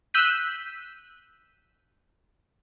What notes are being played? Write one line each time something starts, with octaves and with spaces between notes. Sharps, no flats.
E6 F#6 G6 B6 D#7